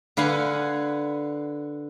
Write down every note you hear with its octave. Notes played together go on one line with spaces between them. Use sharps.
D3 B4 F5 F#5 G#5